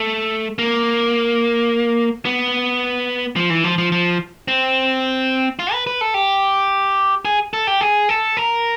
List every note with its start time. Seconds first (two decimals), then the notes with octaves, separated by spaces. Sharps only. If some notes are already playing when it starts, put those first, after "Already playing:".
Already playing: A3
0.58 A#3
2.25 B3
3.36 F3
3.50 E3
3.64 F3
3.78 F3
3.92 F3
4.48 C4
5.59 F4
5.73 B4
5.87 B4
6.01 A4
6.14 G4
7.25 G#4
7.53 A4
7.67 G4
7.81 G#4
8.09 A4
8.37 A#4